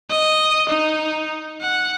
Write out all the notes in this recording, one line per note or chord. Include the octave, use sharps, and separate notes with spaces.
D#5
D#4
F#5